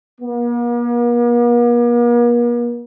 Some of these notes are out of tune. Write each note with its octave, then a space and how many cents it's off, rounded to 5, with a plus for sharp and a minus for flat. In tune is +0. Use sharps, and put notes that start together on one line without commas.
A#3 +45